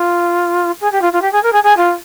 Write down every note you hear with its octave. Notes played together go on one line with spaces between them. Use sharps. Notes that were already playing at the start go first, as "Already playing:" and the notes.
Already playing: F4
G#4
G4
F4
F4
G4
G#4
A#4
G#4
G#4
F4